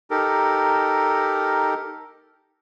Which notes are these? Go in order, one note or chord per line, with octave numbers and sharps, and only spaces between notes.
D#4 G4 A4 A#4